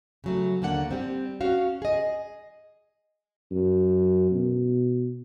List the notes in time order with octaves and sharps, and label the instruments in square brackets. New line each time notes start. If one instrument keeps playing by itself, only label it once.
[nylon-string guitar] C#3 F#3 A3
D#2 D3 A#3 D4 F#5
G3 C4
C#4 F#4 F5
G#4 D#5
[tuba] F#2
B2